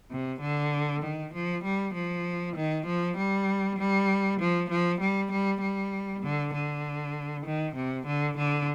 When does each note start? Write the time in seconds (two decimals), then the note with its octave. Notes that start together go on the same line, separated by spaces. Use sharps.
0.11 C3
0.41 D3
1.03 D#3
1.34 F3
1.64 G3
1.94 F3
2.56 D#3
2.87 F3
3.17 G3
3.79 G3
4.40 F3
4.70 F3
5.01 G3
5.32 G3
5.61 G3
6.23 D3
6.54 D3
7.46 D#3
7.76 C3
8.06 D3
8.37 D3